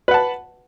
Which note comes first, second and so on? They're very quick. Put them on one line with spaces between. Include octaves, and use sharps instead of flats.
B4 F#5 A5